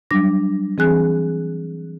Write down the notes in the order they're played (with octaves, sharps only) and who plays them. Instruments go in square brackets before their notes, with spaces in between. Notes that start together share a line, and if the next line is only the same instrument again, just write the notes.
[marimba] F#3 G3 D4 D6 A#6
E3 C4 G#4 G#5 F#6